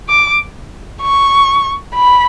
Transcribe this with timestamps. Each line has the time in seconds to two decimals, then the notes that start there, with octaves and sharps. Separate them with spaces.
0.09 D6
1.02 C#6
1.95 B5